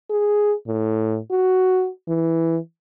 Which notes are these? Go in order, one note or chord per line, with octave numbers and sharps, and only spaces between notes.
G#4
A2
F#4
E3